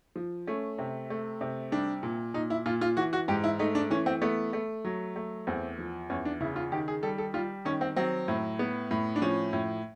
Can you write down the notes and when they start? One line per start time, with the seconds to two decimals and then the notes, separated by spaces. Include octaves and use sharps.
0.16 F3
0.47 A3 C#4
0.79 C3
1.10 A3
1.41 C3
1.72 G3 D4
2.03 A#2
2.34 A#2 D#4
2.50 E4
2.66 A#2 F4
2.81 F4
2.97 E3 F#4
3.13 F#4
3.28 G#2 G4
3.44 E4
3.59 A3 D#4
3.75 D4
3.90 E3 C#4
4.06 C4
4.22 A3 B3
4.53 A3
4.85 F#3
5.16 A3
5.47 E2 C4
5.78 F3
6.10 E2 C#4
6.25 D4
6.41 C#3 E4
6.56 F4
6.72 D#3 G4
6.88 G#4
7.03 G3 A4
7.18 A4
7.34 G3 F4
7.65 D#3 C#4
7.81 C4
7.96 F#3 C4
8.28 A2
8.59 B3
8.91 A2
9.16 D4
9.22 F3 C#4
9.53 A2